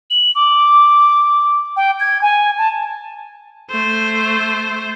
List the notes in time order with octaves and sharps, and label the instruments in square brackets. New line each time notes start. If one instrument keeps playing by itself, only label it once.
[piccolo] F#7
D6
G5
G#6
G#5
A5
[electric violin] A3 C5